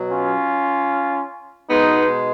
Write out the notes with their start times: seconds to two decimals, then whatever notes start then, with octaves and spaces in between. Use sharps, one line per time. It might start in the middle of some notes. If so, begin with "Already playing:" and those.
Already playing: B2 F#3
0.11 C#4 F4
1.69 B2 G#3 B3 D#4